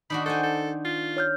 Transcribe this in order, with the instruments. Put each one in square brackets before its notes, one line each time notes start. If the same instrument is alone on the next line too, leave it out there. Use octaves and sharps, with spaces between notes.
[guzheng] D#3 D4 F#4 [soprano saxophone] B5
[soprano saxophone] A4 [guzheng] C5 G5 G#5
[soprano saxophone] A4
F4
[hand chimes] C#5 F6 G6